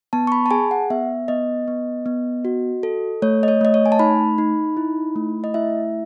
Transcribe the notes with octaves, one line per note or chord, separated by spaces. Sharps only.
B3 A5
C#6
B5
A5
G#4 G#5
F#5
B3 E5
B3 D#5
B3
B3
F#4
A4
A3 C#5
D#5
C#5
A3 D#5
C#5
G#5
A5
D#4 B5
D#4
E4
A3
D#5
E4 E5